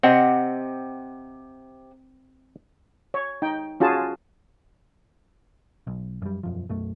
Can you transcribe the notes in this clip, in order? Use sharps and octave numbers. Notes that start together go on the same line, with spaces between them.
C3 C4 D#5 F#5
C#5
D#4 G5
C#4 F4 F#4 G#4 A5
B1
F#2 G3
E1 F#2 F3
B1 F#2 A3